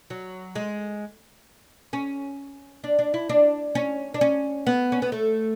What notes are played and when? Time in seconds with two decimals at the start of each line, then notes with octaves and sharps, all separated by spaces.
0.10 F#3
0.55 G#3
1.93 C#4
2.84 D4
2.99 D4
3.14 E4
3.29 D4
3.75 C#4
4.14 D4
4.21 C#4
4.67 B3
4.92 C#4
5.02 B3
5.12 A3